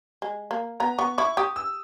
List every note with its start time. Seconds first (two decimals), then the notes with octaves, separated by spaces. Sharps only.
0.22 G#3
0.51 A#3
0.80 B3 A#5
0.98 B3 C#6
1.18 E4 C#6
1.37 G4 D#6
1.56 E6